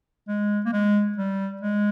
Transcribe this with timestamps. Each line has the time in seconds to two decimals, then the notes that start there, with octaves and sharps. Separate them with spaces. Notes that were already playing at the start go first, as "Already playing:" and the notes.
0.28 G#3
0.65 A#3
0.73 G#3
1.18 G3
1.61 G#3